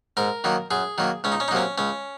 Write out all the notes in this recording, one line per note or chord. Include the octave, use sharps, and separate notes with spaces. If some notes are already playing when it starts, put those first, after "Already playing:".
G#2 A#4
D#3 F#3 A#3
F#2 G#4
D#3 F#3 A#3
C#2 C#4
D#4
C#4
D#4
C3 F#3 A#3 C#4
C#2 C#4